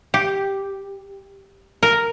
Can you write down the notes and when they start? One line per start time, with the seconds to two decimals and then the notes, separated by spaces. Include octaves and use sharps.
0.14 G4
1.83 A#4